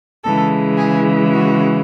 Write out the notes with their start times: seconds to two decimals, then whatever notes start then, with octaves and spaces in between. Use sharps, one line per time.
0.24 C#3 E3 G#3 A4
0.77 G#4
1.30 F#4